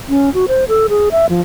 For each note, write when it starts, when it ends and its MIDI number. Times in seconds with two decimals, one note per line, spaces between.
0.09 0.33 61
0.34 0.46 66
0.48 0.65 72
0.68 0.87 69
0.89 1.09 68
1.12 1.26 76
1.29 1.41 53